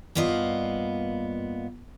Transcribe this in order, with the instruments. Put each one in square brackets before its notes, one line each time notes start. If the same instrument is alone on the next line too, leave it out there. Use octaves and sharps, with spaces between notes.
[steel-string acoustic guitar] G2 A#3 B3 F4 D#5